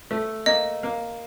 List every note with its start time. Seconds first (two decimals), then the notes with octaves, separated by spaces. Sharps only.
0.11 A3
0.46 A#3 D#5
0.83 A#3